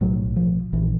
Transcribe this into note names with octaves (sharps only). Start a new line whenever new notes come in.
B1 A2 F#3
F3
A#1 E3